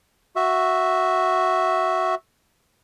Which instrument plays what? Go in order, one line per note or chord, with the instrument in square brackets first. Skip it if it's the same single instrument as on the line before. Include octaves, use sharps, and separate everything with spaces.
[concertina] F#4 E5